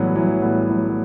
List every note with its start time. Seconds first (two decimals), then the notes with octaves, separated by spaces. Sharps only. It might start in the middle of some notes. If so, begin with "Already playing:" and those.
Already playing: A2 E3 F#3 G3 B3
0.15 E3 F#3
0.42 A2 G3 B3
0.69 A2 F#3 A3